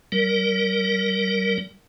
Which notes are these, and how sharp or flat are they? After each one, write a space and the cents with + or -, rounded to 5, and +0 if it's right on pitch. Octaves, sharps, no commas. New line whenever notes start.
G3 -30 A#4 +0